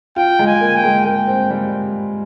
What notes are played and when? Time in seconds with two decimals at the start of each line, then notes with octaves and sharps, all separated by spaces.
0.16 F4 G5
0.39 G#3
0.46 G#5
0.61 A#3
0.76 G5
0.84 G#3
1.05 A#3 G5
1.27 C4
1.51 G3